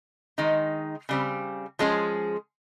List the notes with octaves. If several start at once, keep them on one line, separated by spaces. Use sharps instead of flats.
D#3 G#3 D#4
C#3 G3 C4
F3 G#3 C#4 G#4